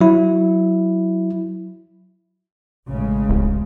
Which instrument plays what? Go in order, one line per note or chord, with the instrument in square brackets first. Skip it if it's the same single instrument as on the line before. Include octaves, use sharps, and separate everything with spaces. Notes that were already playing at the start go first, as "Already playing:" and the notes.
[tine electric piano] F#3 E4
[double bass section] A1 C#3 G#3
[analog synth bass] D1